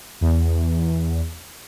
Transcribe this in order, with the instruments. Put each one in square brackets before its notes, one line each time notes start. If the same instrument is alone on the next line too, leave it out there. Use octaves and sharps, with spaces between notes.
[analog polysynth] E2